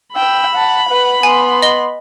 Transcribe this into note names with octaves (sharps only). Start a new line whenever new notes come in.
G5 B5 E6
F#5 A5
B4 F#5
B3 G#5 C6
D#5 G7